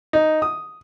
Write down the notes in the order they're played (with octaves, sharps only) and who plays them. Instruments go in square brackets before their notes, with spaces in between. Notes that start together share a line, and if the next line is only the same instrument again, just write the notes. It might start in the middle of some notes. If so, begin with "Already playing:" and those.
[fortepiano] D#4
D#6